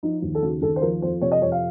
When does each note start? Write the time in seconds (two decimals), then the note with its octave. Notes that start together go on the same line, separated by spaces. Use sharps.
0.03 F3 D#4
0.22 D#2
0.35 A4
0.42 C#3 F#4
0.62 D#2 A4
0.76 C5
0.82 F3 A#4
1.02 F2 C5
1.22 C3 C#5
1.32 D#5
1.42 F2 C#5
1.52 F5